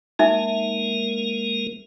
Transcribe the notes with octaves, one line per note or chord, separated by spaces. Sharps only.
G#3 A#3 D#4 A#4 E5 G#5